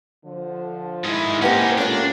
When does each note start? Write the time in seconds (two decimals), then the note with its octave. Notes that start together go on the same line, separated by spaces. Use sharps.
0.24 D3 F3
1.05 G#2 D#3 G#3 D#4 E4
1.42 A#3 C4 C#4 D#4 G4 B4 F#5 G#5
1.78 D#2 G#3 A3 C#4 D4 F4 A#4